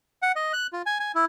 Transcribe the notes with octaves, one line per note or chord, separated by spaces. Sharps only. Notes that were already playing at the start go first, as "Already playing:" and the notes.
F#5
D#5
F#6
F4
G#5
G#5
E4